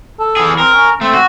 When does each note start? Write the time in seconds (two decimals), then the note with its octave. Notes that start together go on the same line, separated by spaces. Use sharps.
0.20 A4
0.37 E3 G#4
0.58 C4 A#4
0.74 C#4
1.01 A3 C4
1.14 F#4